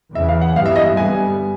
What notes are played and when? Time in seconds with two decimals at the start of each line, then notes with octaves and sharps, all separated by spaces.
0.15 E2 C#3 E3 E5
0.29 F5
0.41 F#5
0.56 G2 E3 G3 B3 F5
0.66 E5
0.76 D#5
0.86 E5
0.96 G2 D3 G3 B3 G#5